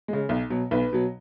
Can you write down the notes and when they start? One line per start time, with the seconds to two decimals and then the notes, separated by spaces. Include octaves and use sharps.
0.08 C#3 G#3
0.29 B1
0.50 B2 F#3
0.71 B1 B4
0.93 B2 F#3